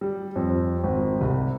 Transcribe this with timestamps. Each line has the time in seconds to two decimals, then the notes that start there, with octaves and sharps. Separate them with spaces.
0.01 G3
0.36 F2
0.83 G#1
1.21 C2